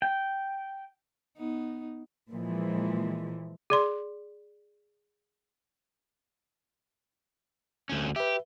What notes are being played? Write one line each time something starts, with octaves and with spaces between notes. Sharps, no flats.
G5
B3 D#4
A#2 E3 F3 G#3
G#4 D5 C6
D2 C#4
G4 B4 E5